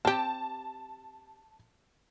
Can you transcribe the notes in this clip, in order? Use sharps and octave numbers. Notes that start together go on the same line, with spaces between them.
C4 G4 A5